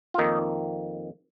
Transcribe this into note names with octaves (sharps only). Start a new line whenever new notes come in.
F4
F2 D#3 A#3 D#4